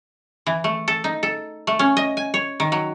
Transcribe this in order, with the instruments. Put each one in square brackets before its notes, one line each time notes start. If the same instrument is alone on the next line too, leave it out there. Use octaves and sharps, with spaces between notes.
[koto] E3
A3
A4
D#4
A4
A3
C#4
D#5
G#5
C#5
D#3
F#3